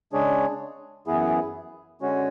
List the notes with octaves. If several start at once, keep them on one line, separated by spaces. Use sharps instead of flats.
C#3 G#3 D4 G#4 C#5
F#2 E3 B3 E4 G#4
D3 G#3 C#4 F#4 C#5